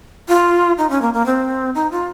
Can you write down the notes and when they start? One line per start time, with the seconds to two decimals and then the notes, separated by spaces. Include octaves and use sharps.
0.28 F4
0.78 D#4
0.90 C#4
1.02 A#3
1.14 A#3
1.26 C4
1.75 D#4
1.91 F4